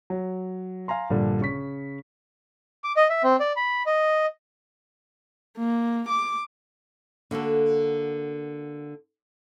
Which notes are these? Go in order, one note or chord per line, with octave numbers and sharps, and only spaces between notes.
F#3
F5 G#5 A#5 C6
A#1 G2 A#2 D3
C#3 C#6 B6
D6
D#5
E5
C4
D5
B5
D#5
A#3
D6
D3 A#3 F#4 A4